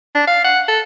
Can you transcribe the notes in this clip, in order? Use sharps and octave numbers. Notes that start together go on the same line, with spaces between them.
D4
F5
F#5
A4